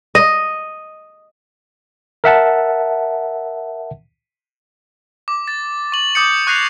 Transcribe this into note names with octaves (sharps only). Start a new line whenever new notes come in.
D#5
A#4 E5 F#5 A5
D6
A6
C#6 F#7
D6 D#6 G6 C#7
C#6 F#6 G#6 A#6 C7 F7